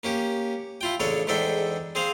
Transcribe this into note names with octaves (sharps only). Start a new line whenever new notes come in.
A#3 C#4 G4
E4 F4 G5
A1 C#3 D4 A4 C#5
E2 G#2 D4 A4 E5 G5
C4 G#4 C5 F5